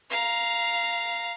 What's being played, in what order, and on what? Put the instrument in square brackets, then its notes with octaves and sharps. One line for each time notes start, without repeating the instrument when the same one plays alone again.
[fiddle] F5 A#5